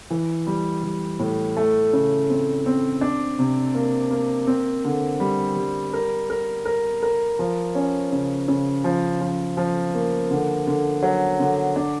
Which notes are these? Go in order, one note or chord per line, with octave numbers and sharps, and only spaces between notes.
E3
G3
G3
A2
A3
C#3
C4
C4
D4
C3
A#3
A#3
C4
D3
G3
G3
A#4
A#4
A#4
A#4
F3
C#4
C#3
C#3
F3
F3
F3
A#3
D3
D3
F#3
D3
D4